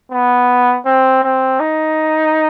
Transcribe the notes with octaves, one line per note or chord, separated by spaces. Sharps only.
B3
C4
C4
D#4